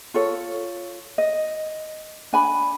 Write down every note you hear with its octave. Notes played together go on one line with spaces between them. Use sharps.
F4 A4 C#5
D#5
D4 G#5 B5